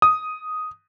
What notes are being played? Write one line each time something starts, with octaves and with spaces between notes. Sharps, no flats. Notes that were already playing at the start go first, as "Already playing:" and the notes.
D#6